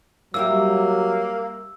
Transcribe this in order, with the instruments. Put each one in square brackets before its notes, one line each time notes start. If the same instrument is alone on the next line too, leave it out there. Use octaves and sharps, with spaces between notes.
[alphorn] F#3 [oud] G3 E4 G4 [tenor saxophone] A#3 [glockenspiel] E6